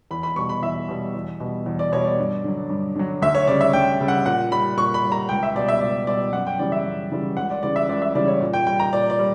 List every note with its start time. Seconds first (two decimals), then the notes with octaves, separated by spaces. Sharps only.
0.11 E2 B5
0.23 B5
0.36 B2 G3 C#6
0.49 B5
0.63 E2 E5
0.88 B2 G3
1.15 E2
1.40 B2 G3
1.66 E2
1.79 D5
1.92 B2 G3 C#5
2.05 D5
2.18 G2
2.44 D3 F#3
2.70 G2
2.96 D3 F#3
3.22 D2 E5
3.35 C#5
3.48 C#3 G3 D5
3.61 E5
3.73 D2 G5
4.00 C#3 G3
4.08 F#5
4.26 A#2 F#5
4.52 G3 B5
4.77 A#2 C#6
4.94 B5
5.03 G3
5.12 A#5
5.29 C#2 G5
5.43 E5
5.55 B2 G3 D5
5.69 E5
5.81 C#2 D5
6.07 B2 G3 D5
6.33 F#2 F#5
6.47 G5
6.59 C#3 E3 G3 D5
6.72 E5
6.84 F#2
7.12 C#3 E3 G3
7.37 C#2 F#5
7.50 D5
7.63 C#3 E3 G3 D5
7.76 E5
7.89 C#2 D5
8.02 E5
8.15 C#3 E3 G3 D5
8.28 C#5
8.41 A#2
8.53 G5
8.67 G3 G5
8.80 A#5
8.93 A#2 D5
9.10 D5
9.19 G3